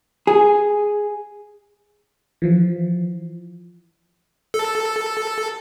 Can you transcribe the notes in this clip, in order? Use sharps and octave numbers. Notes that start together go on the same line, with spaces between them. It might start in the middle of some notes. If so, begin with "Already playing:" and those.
G#4
E3 F3
A4